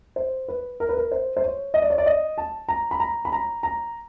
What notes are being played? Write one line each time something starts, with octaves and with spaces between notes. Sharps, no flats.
C5
B4
A#4
B4
A#4
C5
C5
C#5
D#5
D5
C#5
D5
D#5
A5
A#5
B5
A#5
B5
A#5
A#5